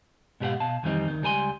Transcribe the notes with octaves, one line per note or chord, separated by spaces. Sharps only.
G#2 B2 G4 A#4 F5 F#5
B2 F5 A5
F2 D#3 E3 G3 C4 D#4
D2 D#3
C#2 G3 A#4 G#5 C6